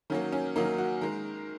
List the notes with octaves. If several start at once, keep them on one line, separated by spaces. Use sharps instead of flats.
D#3 F#3 A#3 C#4
C#4
D#3 F#3 A#3 D#4
F#4
D#3 G#3 A#4